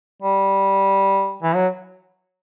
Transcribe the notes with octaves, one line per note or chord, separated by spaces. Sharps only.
G3
E3
F#3